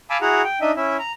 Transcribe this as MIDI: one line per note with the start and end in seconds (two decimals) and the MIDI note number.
0.10 0.17 77
0.10 0.17 80
0.10 0.17 81
0.10 0.17 83
0.10 0.17 86
0.10 0.17 88
0.22 0.42 64
0.22 0.42 66
0.22 0.42 68
0.22 0.42 78
0.22 0.42 82
0.44 0.59 79
0.61 0.71 62
0.61 0.71 63
0.61 0.71 75
0.61 0.71 76
0.76 0.97 61
0.76 0.97 64
0.76 0.97 76
0.99 1.12 82